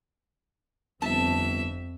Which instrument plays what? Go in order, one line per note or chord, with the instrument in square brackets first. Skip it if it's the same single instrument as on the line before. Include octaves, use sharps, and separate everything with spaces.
[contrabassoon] G1 [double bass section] F2 C4 [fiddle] E5 [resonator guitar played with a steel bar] A5